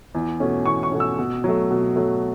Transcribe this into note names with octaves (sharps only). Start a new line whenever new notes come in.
E2
B2 A3 C#4
E2 C#6
C#6
B2 A3 C#4
E6
B2
F#3 A3
B2
F#3 A3